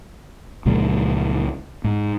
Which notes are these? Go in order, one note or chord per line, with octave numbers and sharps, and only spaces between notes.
C#2 A#2 F3 G#3
G#2